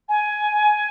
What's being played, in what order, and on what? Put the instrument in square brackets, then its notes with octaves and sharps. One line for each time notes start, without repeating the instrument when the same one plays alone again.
[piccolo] G#5